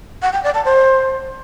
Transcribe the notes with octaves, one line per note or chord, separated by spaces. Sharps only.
F#5
G5
D5
A5
C5